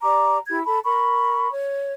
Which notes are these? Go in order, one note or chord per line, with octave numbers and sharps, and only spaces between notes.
G4 D5 A#5 D6
E4 G4 G#6
A4 A5 B5
A#4 B5 C#6
C#5